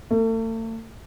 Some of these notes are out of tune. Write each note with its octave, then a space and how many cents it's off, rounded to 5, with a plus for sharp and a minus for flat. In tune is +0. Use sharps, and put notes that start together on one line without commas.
A3 +40